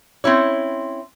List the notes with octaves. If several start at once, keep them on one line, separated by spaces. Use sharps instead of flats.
C4 C#4 E4 C#5